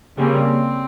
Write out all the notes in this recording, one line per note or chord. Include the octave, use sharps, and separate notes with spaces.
C#3 G3 A#3 C4 C#4